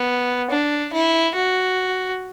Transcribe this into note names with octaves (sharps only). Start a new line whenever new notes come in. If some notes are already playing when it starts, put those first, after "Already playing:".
Already playing: B3
D4
E4
F#4